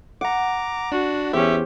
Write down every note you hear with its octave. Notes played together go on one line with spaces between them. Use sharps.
F#5 A#5 D6
D4 F#4
E2 C#4 G4 C5 E5